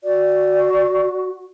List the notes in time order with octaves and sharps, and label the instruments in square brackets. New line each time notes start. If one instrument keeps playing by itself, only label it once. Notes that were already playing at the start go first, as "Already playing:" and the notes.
[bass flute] F#4 [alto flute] D5